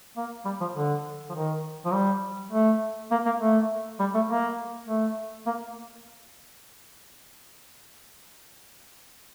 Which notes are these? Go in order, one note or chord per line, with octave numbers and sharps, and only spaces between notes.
A#3
G3
F3
D3
F3
D#3
F3
G3
A3
A#3
A#3
A3
G3
A3
A#3
A3
A#3